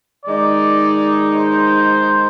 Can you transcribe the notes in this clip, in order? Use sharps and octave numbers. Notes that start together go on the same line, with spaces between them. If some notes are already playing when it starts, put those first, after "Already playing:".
D#3 G#3 D#4 D5
C5